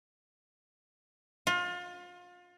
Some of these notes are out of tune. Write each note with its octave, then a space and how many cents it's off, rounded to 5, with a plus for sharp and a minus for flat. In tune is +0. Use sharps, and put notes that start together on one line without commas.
F4 +30